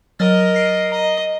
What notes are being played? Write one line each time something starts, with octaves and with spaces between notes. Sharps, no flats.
F#3 A#4 D#5 F6 A6
A#6 C7 D7
D#5 A#5